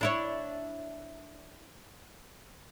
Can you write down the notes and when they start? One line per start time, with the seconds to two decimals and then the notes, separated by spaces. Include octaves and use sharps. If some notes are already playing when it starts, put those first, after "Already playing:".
0.01 D4 E4 C#5